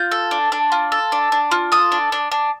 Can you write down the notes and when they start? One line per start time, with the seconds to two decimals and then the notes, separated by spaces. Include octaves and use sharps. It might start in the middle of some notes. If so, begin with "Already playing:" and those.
Already playing: F4 G6
0.11 A4
0.31 D4
0.52 D4
0.72 F4
0.92 A4
1.12 D4
1.32 D4
1.52 F4
1.72 A4 D#6
1.92 D4
2.12 D4
2.32 D4